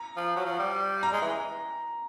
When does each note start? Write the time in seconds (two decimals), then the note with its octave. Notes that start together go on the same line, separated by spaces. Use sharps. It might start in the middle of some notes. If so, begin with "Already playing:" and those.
Already playing: A#5
0.17 F3
0.36 F#3
0.46 F3
0.59 G3
1.03 A#5
1.13 G#3
1.22 E3